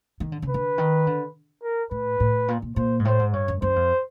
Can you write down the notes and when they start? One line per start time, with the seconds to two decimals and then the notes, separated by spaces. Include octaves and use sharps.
0.20 D#3
0.32 D3
0.42 C#3
0.49 D3 B4
0.78 D#3
1.07 D3
1.63 A#4
1.91 A2 B4
2.20 A2
2.48 A#2
2.62 A#2
2.76 A#2 C5
2.99 G#2
3.05 A2 C5
3.19 G#2
3.33 G2 C#5
3.48 F#2
3.62 F#2 C5
3.76 F2